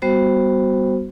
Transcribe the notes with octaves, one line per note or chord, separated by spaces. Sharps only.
G3 B3 F#4 C5